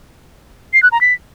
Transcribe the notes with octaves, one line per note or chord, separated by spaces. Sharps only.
C7
F#6
A#5
B6